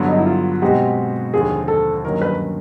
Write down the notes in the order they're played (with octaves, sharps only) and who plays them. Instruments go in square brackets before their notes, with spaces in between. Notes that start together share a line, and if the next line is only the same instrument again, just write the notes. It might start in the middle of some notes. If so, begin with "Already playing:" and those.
Already playing: [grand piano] G2 D3 F#3 B3
[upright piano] D#4
E4
F4
[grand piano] B2 G#3 C4 D#4 F#4 [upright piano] G4
[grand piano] D#2 D3 F3 [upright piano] G#4
[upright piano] A4
[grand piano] G2 D#3 F#3 A#3 C#4 [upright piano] A#4
[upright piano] B4